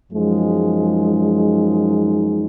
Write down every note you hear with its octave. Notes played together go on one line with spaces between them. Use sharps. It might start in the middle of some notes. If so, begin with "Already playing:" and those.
F#2 F3 G#3 D#4